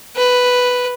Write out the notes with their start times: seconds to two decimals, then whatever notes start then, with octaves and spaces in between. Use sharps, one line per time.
0.17 B4